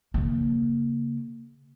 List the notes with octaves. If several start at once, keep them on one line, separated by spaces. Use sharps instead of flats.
C#3 A#3